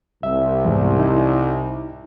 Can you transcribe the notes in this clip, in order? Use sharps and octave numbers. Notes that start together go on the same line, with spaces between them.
C2 E5
E2 G#2 E3
D#4 E4